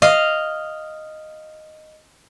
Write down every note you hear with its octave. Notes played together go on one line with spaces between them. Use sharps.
D#5 F5